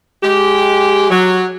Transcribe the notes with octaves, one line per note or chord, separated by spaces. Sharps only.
G#3 G4
F#3